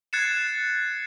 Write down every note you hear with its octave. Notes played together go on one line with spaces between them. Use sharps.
F#6 G#6 A6 C7 C#7 E7